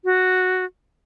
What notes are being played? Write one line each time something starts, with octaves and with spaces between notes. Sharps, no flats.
F#4